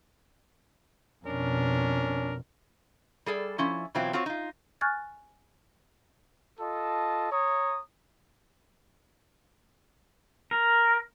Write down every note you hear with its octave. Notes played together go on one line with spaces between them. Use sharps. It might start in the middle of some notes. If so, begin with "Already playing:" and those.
F2 B2 C#4 D4 A#4
G3 G#4 A4 D5
F3 C#4 E4
B2 E3 F#3 C4 E4 F4
C4 F4 F#4 C#5
D#4 F4
G#5 C#6 F6 F#6 G#6 A6
F4 A4 D#5 A5
C#5 A#5 D#6
A#4